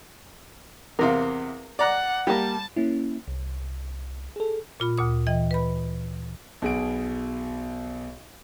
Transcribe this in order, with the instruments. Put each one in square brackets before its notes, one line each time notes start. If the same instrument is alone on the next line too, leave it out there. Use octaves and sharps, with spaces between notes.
[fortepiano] E2 C3 F5 [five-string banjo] A#4
[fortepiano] D5 A#5 F#6 [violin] F#5
[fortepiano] G3 [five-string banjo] A#3 G4 [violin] A5
[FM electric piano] A#3 C#4 E4
C2
G#4 A4
[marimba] A#2 F4 B5
D2 A#2 D#6
E3 D#5 G5
B4 B5
[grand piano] B1 B2 G#4 F#5 D7